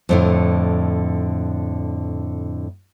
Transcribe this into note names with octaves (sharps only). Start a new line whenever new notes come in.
F2 A2 D3